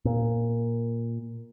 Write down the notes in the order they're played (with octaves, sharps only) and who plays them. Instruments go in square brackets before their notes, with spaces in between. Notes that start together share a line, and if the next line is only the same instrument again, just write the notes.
[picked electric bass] A#2